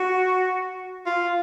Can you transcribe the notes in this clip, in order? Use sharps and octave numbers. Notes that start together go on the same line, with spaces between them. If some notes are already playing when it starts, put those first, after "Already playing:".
Already playing: F#4
F4